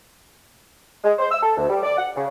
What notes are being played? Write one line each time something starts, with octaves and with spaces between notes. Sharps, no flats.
G#3
C5
E6
A4
D2
G3
D5
F#5
C#3